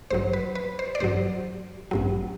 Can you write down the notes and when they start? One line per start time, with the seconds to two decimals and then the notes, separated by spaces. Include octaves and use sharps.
0.10 A1 G2 F#3 C5
0.33 B4
0.55 B4
0.79 C5
0.95 D5
1.00 A1 G2 F#3 C5
1.91 A1 G2 F#3